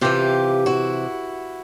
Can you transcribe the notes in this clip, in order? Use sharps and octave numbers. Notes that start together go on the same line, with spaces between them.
C3 E3 F4 G4
E4 F#4